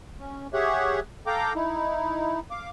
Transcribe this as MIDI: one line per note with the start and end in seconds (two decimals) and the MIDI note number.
0.19 0.47 61
0.53 1.00 67
0.53 1.00 68
0.53 1.00 73
0.53 1.00 76
0.53 1.00 78
1.27 1.53 69
1.27 1.53 77
1.27 1.53 79
1.27 1.53 82
1.27 1.53 86
1.55 2.40 63
1.55 2.40 64
2.51 2.70 77
2.51 2.70 86